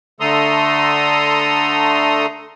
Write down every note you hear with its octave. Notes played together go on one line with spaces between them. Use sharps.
D3 A3 A4 A#5 C6 D#6